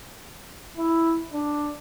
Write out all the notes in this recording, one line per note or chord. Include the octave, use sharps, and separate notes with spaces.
E4
D4